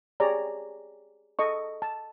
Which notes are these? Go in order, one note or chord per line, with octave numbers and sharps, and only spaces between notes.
G4 G#4 C#5 D5 A#5
A4 D#5 C#6
A5